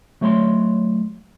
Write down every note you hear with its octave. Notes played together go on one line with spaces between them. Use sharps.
F#3 A3 C#5 A#5 C6